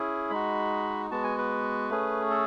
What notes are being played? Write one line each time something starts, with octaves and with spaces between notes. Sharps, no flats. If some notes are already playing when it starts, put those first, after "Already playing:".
Already playing: C#4 E4 G#4
G#3 D#4 F#4 B5
G#3 B3 F#4 A5
G#5
B4
A3 C#4 G#4
A4